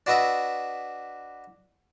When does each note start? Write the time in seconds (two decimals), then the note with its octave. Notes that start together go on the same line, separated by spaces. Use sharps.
0.06 D4 F#4 B4 D#5 E5